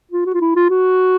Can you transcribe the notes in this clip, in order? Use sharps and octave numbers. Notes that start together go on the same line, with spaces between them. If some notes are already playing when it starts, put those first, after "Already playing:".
F4
F#4
F4
E4
F4
F#4